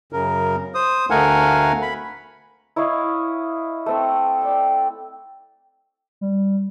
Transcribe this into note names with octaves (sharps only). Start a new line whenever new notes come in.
F#2 C#3 A#4
C5 D#6
D2 A3 A#4 F5 F#5 G#5
B5
E4 C#5 D#5 F5
A3 C4 A4
D5 G5
G3